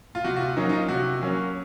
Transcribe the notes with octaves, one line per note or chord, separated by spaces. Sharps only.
F4
C3 F#4
F#4
F4
F#3 A#3 C#4 D#4
D#4
F4
C3 F#4
F#3 A#3 C#4